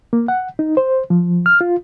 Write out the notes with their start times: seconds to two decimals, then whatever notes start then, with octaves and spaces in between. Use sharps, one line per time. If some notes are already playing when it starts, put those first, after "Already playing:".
0.13 A#3
0.28 F#5
0.59 D#4
0.77 C5
1.10 F3
1.46 F6
1.61 F4